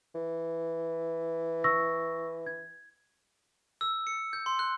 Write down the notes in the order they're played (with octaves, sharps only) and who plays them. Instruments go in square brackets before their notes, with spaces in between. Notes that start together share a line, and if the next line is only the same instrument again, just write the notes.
[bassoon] E3
[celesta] C#6 E6 A#6
G#6
[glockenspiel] E6
C#7
G6
C6
F#6